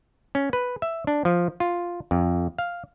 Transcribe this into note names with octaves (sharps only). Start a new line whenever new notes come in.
C#4
B4
E5
D4
F3
F4
F2
F5